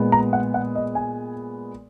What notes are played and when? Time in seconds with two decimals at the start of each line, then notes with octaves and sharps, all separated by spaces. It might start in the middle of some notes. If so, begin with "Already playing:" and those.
Already playing: A#2 G#3 B3
0.12 A#5
0.33 F#5
0.54 F#5
0.75 D#5
0.95 G#5